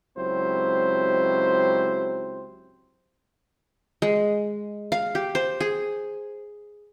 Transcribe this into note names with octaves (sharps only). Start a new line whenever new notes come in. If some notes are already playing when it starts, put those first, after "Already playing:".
C#2 F#3 C4 E4 G4 C5
G#3
F5
G4
C5
G#4